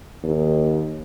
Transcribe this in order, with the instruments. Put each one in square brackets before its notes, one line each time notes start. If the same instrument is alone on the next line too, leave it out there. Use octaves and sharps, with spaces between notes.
[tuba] D#2